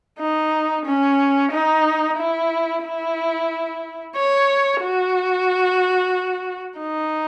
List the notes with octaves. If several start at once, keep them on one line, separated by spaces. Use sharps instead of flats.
D#4
C#4
D#4
E4
E4
C#5
F#4
D#4